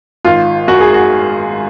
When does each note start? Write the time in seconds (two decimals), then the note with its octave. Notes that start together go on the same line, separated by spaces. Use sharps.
0.25 G#1 F4
0.68 F#2 F#4
0.81 G#4
0.94 F#4